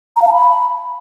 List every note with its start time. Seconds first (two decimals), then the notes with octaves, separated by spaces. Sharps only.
0.16 A#5
0.22 F5
0.27 A5
0.33 B5